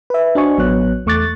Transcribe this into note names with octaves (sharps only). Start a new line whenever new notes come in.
B4 E5
D4 F#4 C5 D#5 G#5 C#6
A1 F#3 B3 C#5 F#6
E2 A3 C#6 D6 F#6 A6